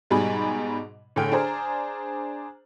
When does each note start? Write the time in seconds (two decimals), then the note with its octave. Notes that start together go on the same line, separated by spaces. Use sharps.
0.10 G#2 B2 G3 G#4 G#5 B5
1.16 A2 D3 G#4 G5 F6 D7
1.32 D4 G#4 C5 A#5